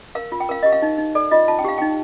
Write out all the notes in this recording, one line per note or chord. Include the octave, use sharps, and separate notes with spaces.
A#4 F5
F4
G5
A#4 F5
G4 D#5
F5
D#4
D#4
A4 D5
F4 D#5
F4 A5
G5
G4 F5
D#4 G5